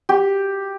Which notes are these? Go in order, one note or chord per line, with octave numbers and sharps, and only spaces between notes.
G4